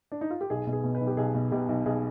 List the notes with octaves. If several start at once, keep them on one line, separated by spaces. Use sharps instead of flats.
D4
D#4
F4
G4
B1 G#4
B2
G#4
B2
B4
B1
G4
B1 G#4
B2
B2 G4
B1
B1 G#4